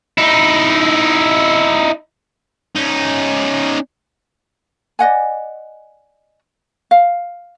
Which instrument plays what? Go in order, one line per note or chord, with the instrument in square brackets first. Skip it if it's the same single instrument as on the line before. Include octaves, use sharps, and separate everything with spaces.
[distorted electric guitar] D#4 E4
C#4 D#4
[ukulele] D5 D#5 F#5 G#5
F5